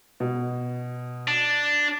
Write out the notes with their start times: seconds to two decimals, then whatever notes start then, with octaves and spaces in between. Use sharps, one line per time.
0.20 B2
1.28 D4